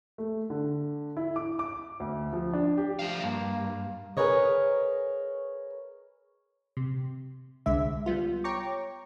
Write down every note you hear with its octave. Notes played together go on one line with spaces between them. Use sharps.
A3
D3
E4
D6
D6
D2
F3
D4
G4
F3 A3 F5
G2 A#3
G#4 A#4 B4 C#5 D#5
C3
C2 D3 G#3 E5
G3 B3 F4
C#5 G5 A#5 C#6 D6